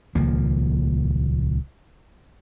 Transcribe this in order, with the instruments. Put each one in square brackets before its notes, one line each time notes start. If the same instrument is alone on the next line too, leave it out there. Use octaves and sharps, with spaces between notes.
[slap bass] D#1 C#2 F3 A#3